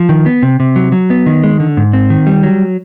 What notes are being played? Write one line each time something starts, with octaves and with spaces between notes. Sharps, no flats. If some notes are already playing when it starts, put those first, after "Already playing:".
Already playing: F3
D#3
B3
C3
C3
F#3
F#3
B3
D#3
G#3
D3
G#2
C4
D#3
G3
F#3